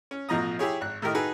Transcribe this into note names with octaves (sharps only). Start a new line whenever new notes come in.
C#4
A1 B2 F3 D#5 A#5 D#6
E4 G4 G#4 C#5
G#1 F#6
A2 D#3 G4 A#4 D#5
D#4 F#4 G#4 A4 B4